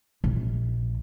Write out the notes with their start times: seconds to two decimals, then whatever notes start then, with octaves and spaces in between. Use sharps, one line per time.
0.24 A#1